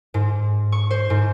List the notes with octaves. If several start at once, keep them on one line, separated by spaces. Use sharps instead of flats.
G#2
C#6
C5
G#2